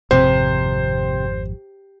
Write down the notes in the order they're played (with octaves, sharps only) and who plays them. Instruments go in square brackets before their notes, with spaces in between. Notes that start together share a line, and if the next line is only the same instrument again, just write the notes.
[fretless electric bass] G#1 F2 [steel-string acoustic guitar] C3 [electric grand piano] C5